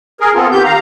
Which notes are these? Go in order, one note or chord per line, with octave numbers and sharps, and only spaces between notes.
G#4 A#4
B3 C4 F4 A4
D#3 G4 G6
F5 A#5